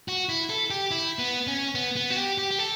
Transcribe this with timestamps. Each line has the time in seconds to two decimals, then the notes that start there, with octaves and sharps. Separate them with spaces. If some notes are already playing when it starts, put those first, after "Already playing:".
0.08 F#4
0.29 E4
0.50 A4
0.70 G4
0.91 E4
1.19 B3
1.47 C#4
1.75 B3
1.96 B3
2.10 F#4
2.16 G4
2.38 G4
2.51 G4
2.58 A4